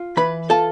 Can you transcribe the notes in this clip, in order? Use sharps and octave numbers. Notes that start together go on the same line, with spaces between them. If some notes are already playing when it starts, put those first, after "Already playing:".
Already playing: F4
E3 B4 B5
F4 A4 A5